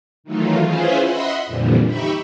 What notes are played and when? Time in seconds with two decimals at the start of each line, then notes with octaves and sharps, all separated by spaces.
0.24 D#3 E3 F#3 A3 D#4 F4
0.61 C#4 E4 F4 G#4 B4 C5
1.02 D#5 E5 F#5 B5 C6
1.46 F2 A#2 D3 E3 F3 G3
1.85 D#4 G4 E5 B5 C#6